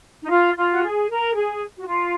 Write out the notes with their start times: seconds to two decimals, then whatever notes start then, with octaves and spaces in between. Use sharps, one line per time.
0.22 D#4
0.30 F4
0.56 F4
0.71 F#4
0.82 G#4
1.08 A#4
1.34 G#4
1.76 F#4
1.86 F4